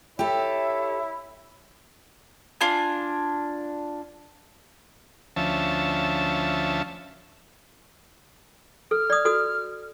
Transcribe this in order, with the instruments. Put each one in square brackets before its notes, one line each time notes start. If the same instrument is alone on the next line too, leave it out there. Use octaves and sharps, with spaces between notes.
[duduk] E4 [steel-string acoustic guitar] G4 A4 [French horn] C#5 [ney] E5
[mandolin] D4 F4 G#5
[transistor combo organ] D2 F3 C#4 E5 A5
[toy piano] A4 [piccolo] F6
[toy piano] D5 D#6
F#4 A4 D#6